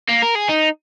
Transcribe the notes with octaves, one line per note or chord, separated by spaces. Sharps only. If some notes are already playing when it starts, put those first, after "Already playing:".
A#3
A#4
G#4
D#4